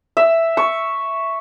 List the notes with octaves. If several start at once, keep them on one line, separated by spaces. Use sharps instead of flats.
E5
C#6